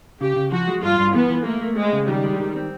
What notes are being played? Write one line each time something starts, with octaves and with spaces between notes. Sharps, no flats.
C#3 G4
C#3
F3 F#4
G#3
G2 F4
G2
E3 B3
E3
A3 A#3
A3
G#3 C4
C#3
D#3 G3
G#3
D#3
C4